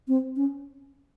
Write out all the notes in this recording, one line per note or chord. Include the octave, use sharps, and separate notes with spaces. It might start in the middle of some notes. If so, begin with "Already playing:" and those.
C4
C#4